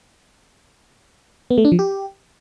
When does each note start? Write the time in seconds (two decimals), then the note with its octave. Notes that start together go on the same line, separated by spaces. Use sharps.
1.50 B3
1.58 A3
1.65 D4
1.72 F3
1.79 G4